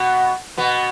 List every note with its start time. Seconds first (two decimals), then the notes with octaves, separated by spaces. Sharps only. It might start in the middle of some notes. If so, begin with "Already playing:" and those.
Already playing: B2 B3
0.58 B2 B3